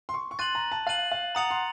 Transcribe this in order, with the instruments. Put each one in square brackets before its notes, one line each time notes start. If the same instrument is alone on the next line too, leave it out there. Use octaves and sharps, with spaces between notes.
[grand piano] C6
C#6
C#6
[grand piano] C6 [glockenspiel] F#6 A6 D#7 F#7
[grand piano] A#5
A5
[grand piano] F5 [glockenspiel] F#6 A6 D#7 F#7
[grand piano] F5
[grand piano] F#5 [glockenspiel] A#5 D#6 A6 C#7 F7
[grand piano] C6